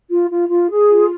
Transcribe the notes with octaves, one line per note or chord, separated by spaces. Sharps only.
F4
F4
F4
G#4
F4